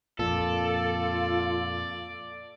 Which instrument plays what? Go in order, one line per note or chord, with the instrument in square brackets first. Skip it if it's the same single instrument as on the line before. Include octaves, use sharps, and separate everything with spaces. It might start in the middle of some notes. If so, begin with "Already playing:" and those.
[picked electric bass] F2 A#2 [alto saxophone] F4 [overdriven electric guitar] A4 [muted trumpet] D5